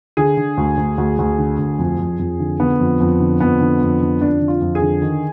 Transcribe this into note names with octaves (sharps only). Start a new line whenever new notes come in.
D3 G#4
D3
D2
D2
D2
D2
D3
D2
F2
F2
F2
D3
D3 B3
F2
F2
D3
F2 B3
D3
F2
D3
F2 D4
D3
F4
F2
G#4
D3
D#3